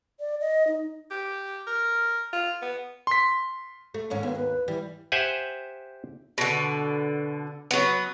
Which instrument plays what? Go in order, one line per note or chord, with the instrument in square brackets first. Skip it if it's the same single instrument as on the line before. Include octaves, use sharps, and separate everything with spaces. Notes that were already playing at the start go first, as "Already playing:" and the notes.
[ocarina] D5
D#5
D#4
[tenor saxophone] G4
A#4
F4
B3
[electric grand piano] C6 B6
[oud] A3
D#2 G#2 C#4
[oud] D#2 [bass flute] B3
[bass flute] B4
[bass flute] E3 [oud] G3
[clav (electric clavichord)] G4 C5 E5 F#5 G#5
[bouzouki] B2 D3
F#3 B3